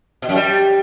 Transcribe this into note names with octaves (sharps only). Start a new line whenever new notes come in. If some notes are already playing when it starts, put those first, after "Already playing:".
B2
F#2
G3